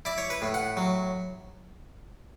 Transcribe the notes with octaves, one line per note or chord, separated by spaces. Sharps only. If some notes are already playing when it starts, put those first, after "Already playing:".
E4 D5
C#5
B4
A2
F#5
F#3